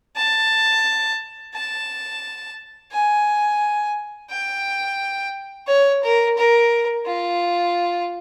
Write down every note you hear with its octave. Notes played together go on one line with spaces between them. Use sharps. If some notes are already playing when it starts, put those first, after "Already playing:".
A5
A5
G#5
G5
C#5
A#4
A#4
F4